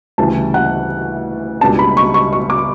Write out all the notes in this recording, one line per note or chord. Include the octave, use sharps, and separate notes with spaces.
D2 C#3 E3 G3 A5
F#5
C#2 B2 G3 D4 A5
B5
C#6
C#6
C#6
D6